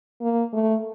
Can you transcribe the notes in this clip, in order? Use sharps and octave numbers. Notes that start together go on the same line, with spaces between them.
A#3
A3